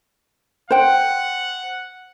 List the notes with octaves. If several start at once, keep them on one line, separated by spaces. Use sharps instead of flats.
C5 F#5 G5